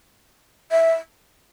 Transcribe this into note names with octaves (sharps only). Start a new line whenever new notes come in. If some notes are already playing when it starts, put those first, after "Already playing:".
E5